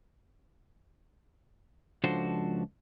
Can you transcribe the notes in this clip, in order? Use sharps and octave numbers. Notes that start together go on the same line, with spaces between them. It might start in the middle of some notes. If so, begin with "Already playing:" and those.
C#2 F3 D4 F#4 A4 C5